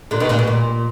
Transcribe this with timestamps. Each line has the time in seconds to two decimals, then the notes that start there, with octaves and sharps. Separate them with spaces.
0.11 A#2 D3
0.20 B2 D#3
0.29 A#2 D3
0.39 B2
0.47 A#2